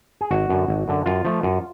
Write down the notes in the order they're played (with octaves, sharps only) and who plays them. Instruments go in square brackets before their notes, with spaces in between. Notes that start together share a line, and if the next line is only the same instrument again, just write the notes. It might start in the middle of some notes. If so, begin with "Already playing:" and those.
[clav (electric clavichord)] G#4
G#1 F#4
F#2 D3
G#1
F#2 D3
F#2 F4
F3 A3
F#2